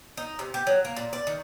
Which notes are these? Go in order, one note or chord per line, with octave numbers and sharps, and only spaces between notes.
D#4
C3
G4
F#3
A#3
A#2
D5
D#3